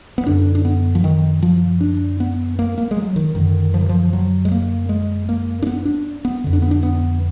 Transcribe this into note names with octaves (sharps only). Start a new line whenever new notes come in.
B3
F#2 D3 D4
D4
B3
F3
D#3
F3
D4
B3
A#3
A#3
G#3
F#3
D#3
F#2 D3 D#3
F3
D#3
F3
F#3
G#3
A#3
G#3
A#3
D4
B3
D4
B3
F2 D3
D4
B3
D4
B3